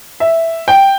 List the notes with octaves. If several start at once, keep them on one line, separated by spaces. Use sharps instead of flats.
E5
G5